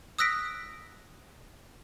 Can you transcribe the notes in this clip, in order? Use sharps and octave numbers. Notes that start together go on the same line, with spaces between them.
D#6 E6 F#6 A#6 B6 D7